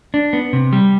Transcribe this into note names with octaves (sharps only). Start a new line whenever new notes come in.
D4
B3
C3
G3